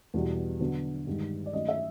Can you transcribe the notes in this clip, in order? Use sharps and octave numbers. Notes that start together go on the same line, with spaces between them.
E2 B2 G3
D3 F#3 B3
G2 D#3 G#3
D5
D#3 F#3 A3 C#4 D#5
E5